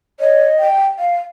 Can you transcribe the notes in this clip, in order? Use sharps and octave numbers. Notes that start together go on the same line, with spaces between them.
C#5 D#5
G5
F5